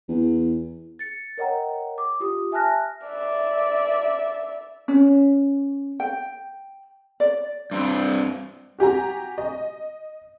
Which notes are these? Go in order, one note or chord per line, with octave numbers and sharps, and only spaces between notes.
E2
A6 C#7
A#4 C#5 D#5 F#5 G5 A#5
D6
F4 G4 D#6
E5 G#5 A5 F6 F#6 A#6
D5 E5
C#4
G5
D5
G2 C4
F#4 G4 G#5 A#5
D#5